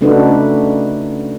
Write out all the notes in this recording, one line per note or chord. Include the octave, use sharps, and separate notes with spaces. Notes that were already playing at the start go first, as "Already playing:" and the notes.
C#3 A3 D4 D#4 F#4 B4